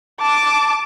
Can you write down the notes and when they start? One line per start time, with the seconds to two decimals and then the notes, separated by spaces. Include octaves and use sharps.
0.21 A5 D6